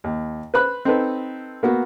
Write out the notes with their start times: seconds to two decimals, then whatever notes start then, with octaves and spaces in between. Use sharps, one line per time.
0.04 D#2
0.54 B4 C5 B5 F#6
0.85 C4 D#4 A4 B4
1.63 A#3 B3 F#4